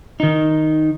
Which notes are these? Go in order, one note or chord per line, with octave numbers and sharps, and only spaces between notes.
D#3 D#4